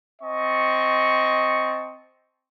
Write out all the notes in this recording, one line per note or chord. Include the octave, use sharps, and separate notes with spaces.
C4 D#5 A5 C#6